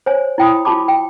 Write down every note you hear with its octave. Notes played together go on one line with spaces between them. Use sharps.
C5 C#5 G#5
E4 G5 B5 D#6
F4 F#4 A5 B5 D6
G5